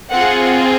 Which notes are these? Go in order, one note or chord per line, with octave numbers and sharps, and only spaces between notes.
C4 F4 G#4 F#5